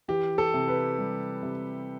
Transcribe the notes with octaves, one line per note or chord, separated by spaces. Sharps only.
E3 G4
A4
C3
B4
G3
C3